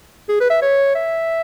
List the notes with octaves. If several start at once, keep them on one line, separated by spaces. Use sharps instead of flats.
G#4
B4
E5
C#5
E5